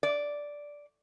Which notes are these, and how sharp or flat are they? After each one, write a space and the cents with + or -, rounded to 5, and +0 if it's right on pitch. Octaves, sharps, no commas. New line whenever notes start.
D5 -5